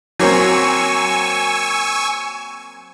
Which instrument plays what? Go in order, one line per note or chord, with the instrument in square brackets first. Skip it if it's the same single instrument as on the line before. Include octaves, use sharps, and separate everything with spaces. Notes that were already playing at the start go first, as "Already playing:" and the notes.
[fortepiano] F#3 A#3 C4 [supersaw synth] G#5 C#6 E6